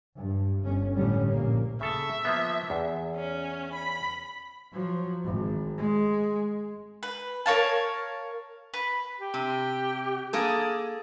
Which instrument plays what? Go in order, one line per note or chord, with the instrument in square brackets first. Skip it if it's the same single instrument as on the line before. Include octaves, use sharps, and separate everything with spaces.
[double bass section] G2
G1 C#4
A2 D3 G3 C#4
A#1 A#2 A#3
[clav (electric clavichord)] C#3 A4 A5 [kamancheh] E5
[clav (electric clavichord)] F3 A#3 B3
E2
[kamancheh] C#4
B5
[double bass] F3 F#3
G#1
G#3
[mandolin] B4
A#4 C#5 F5 A5
B4
[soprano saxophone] G4
[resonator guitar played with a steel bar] C3
A#3 G#4 A4